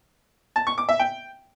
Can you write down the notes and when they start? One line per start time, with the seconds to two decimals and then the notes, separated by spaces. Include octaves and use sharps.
0.56 A5
0.67 C#6
0.78 D6
0.89 E5
1.00 G5